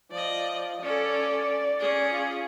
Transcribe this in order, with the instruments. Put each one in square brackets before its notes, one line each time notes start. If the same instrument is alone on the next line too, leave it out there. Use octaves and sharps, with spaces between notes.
[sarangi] F3 [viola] D5 D#5
[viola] C#4 A4 [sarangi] D5
[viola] C#4 G#4
[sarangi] F4